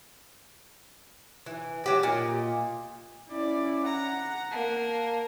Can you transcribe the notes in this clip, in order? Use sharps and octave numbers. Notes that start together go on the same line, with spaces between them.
E3
F#3 G4 D5
A#2 D#5
C#4 E4 D5
F#5 A#5
A#3 A5